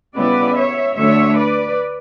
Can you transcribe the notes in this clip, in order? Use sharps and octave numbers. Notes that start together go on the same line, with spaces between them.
C#3 G3 B3 E4 B4 D5
C#5 E5
D2 D3 A3 D4 C#5 E5
B4 D5